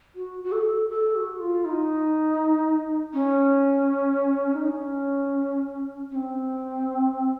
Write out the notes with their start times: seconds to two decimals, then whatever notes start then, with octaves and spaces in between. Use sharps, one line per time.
0.16 F#4
0.44 F#4
0.53 A4
0.90 A4
1.15 F#4
1.40 F4
1.65 D#4
3.14 C#4
4.53 D#4
4.62 C#4
6.11 C#4
6.15 C4